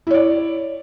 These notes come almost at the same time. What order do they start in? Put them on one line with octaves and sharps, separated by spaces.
E4 C#5 D5